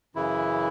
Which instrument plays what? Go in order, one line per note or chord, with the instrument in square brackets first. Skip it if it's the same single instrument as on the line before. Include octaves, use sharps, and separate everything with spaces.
[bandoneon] F#2 C#3 E3 E4